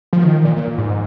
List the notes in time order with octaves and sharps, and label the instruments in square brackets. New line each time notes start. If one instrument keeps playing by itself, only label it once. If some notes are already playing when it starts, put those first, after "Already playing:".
[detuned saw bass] F3
D#3
A#2
A#2
G#2